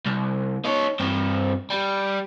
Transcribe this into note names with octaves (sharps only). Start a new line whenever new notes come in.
C2
D#4 C#5
G2 C4
G3